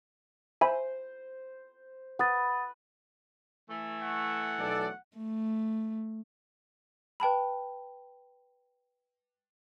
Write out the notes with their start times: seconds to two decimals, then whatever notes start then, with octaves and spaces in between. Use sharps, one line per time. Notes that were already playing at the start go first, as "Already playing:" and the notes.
0.61 C5 E5 G#5 B5
2.19 B4 F#5 D#6 A6
3.70 E3 A3
4.03 F#5
4.59 B1 A4 D5
5.17 A3
7.20 B4 G5 A5 B5